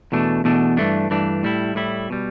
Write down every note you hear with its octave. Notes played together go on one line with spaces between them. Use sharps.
E2 B2 A3 D4
E2 B2 A3 D4
G2 E3 A3 D4
G2 E3 A3 D4
A2 G3 E4
A2 G3 E4
B2 G3